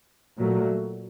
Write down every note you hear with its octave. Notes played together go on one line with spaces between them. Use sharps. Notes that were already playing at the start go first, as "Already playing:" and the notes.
A#2 F#3 A3